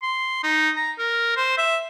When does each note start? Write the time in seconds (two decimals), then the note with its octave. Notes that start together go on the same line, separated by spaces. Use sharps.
0.02 C6
0.44 D#4
0.76 A#5
0.99 A#4
1.36 C5
1.58 E5